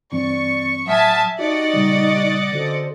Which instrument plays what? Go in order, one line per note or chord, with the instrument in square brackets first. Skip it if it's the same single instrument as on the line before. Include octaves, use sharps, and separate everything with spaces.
[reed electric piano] G2 E3 C4 [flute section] D5 [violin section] C#6
[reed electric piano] A2 F#3 [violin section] E5 G#5 A5 [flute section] F#5 D#6 F6
[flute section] D#4 G4 C#6 [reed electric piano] F#4 [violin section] D5 D#5 F#5
[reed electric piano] A#2 C#3 G3
[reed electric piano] D3 F#4 [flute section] C#4 A4 C5